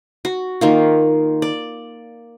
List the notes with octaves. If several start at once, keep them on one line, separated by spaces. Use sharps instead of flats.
F#4
D#3 A#3 F4
D5